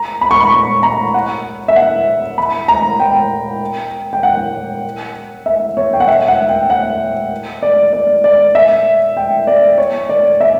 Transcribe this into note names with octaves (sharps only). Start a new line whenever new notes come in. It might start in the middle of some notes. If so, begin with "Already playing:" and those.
Already playing: A#5
B5
C#6
B5
C#6
A#5
F#5
E5
F#5
B5
A#5
G5
G5
F#5
E5
C#5
G5
F#5
E5
F#5
G5
F#5
D5
D5
D5
E5
G5
D5
C#5
D5
E5